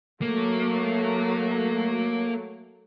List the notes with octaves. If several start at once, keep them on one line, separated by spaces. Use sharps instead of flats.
F#3 A3 A#3